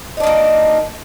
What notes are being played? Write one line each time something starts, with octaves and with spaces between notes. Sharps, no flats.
D#3 A#3 D4 D#4